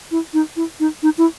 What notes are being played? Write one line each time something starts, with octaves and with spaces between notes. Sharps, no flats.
E4
D#4
E4
D#4
D#4
E4